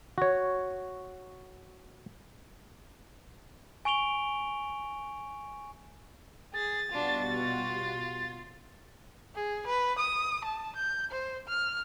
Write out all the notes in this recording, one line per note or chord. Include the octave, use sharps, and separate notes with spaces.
F#4 C#5
G#5 C#6 D7 F7 G7
G#4 A6
B2 G3 D4 F4 F#4
F4
G#4
B4
D#6
A5
G6
C5
F6